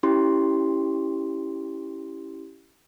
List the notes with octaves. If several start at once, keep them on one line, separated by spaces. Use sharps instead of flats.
C#4 E4 G4 C6